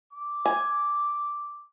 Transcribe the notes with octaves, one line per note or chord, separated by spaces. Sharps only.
D6
G#5